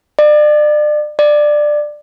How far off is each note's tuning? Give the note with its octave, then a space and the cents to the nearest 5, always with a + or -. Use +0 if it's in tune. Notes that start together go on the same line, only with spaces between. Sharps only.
D5 +35
D5 +15